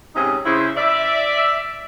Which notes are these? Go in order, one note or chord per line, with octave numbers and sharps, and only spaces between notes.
G#2 C3 C#4 D#4 G#4 D#5
C#3 E4 C5
D5 E5